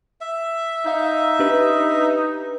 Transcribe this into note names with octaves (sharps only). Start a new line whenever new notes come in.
E5
D#4 F5 G6
D4 G4 B4